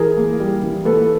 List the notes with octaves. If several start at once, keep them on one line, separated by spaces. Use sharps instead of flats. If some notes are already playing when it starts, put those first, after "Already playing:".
Already playing: E3 G#4 A#4
A#3
G3
E3
A#3 A4 B4